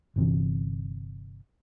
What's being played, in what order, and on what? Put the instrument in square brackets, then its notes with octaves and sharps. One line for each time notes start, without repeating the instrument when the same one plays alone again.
[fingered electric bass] G1 C3 E3